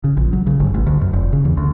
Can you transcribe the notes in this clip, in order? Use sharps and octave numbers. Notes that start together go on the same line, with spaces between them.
C#3
A#1
F#3
C#3
G1
A1
D2
F#2
F1
C#3
E2
D2